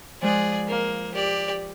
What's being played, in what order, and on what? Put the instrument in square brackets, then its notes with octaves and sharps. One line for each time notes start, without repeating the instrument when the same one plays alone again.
[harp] F3 G#3 F#6 [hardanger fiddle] G#4 D5
[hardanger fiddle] A#3
G4 D5